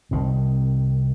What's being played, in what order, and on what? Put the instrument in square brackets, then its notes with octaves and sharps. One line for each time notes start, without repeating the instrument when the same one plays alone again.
[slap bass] C2 C3 D#3